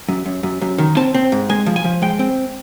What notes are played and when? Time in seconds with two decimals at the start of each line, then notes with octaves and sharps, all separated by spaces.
0.09 F#2
0.26 F#2
0.43 F#2
0.61 F#2
0.78 D#3
0.97 C4 A5
1.14 C4
1.32 G#2
1.49 G#3 G#5
1.66 F3
1.76 G#5
1.84 F3
2.02 G#3 G5
2.19 C4